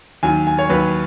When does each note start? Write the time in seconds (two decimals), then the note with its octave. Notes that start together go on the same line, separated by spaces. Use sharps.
0.23 D#2 D#3 F#3 G#5
0.47 G#5
0.59 C#5
0.69 D#2 D#3 F#3 B4